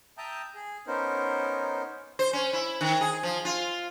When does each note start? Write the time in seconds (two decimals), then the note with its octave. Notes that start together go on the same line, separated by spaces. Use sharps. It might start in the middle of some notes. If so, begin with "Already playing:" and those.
0.18 E5 G5 A5 A#5 D#6 G6
0.55 G#4
0.87 B3 C#4 D#4 A#4 C5
2.19 C5
2.33 C#4
2.53 E4
2.81 D#3
3.01 G#4
3.23 F3
3.45 F4